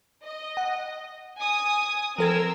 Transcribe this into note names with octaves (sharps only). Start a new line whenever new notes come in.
D#5
F#5
G#5 D#6
F3 C4 A4 A#4 E6 G#6